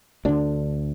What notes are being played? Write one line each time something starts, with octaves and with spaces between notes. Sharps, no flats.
D2 D3 D4